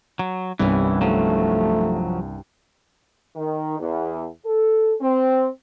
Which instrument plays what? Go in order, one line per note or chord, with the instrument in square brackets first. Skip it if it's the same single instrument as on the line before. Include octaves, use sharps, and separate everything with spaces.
[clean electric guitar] F#3
[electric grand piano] C2 [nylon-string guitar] G2 B3 C#4 [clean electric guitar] E3
[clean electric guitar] F3 F#3 [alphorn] A3
[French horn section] D#3
E2
A4
C4